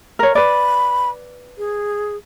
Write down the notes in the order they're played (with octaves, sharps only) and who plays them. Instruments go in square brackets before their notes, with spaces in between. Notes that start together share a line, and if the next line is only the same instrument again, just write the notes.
[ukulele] A#4 C#5
[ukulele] B4 D5 [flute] B5
[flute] G#4